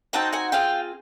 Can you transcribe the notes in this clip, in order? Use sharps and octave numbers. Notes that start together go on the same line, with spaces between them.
C4 D#4 F#4 G5 A5
F#5 G#5
C4 F4 G#4 F5 G5